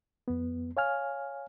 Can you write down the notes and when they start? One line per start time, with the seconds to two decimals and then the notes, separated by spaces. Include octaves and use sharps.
0.28 F2 B3
0.77 C#5 F5 G#5 F6